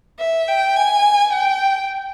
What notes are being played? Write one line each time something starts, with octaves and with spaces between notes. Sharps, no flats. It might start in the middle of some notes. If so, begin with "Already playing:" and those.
E5
G5
G#5
G5